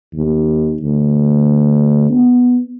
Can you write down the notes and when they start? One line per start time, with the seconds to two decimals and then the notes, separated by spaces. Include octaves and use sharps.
0.14 D#2
0.82 D2
2.10 B3